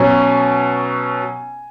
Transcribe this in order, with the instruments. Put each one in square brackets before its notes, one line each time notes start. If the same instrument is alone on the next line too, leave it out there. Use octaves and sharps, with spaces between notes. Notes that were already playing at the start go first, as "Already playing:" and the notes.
Already playing: [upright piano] B2 F#3 C#4 G#5